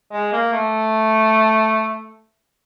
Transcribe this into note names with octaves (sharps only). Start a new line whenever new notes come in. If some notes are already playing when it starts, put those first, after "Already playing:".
G#3
A#3
A3